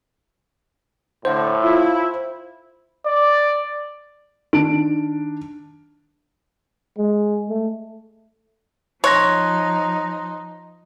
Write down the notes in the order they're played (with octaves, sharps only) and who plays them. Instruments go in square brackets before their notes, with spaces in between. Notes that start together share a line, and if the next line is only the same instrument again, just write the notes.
[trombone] A2 [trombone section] D3 [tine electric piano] C5
[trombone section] E4 [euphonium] F4
[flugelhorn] D5
[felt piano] D#3 D4 D7
[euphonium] G#3
A3
[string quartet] F3 D#4 [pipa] C#5 [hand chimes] C6 F#6 A#6